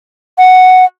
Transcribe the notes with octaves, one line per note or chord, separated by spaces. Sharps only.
F#5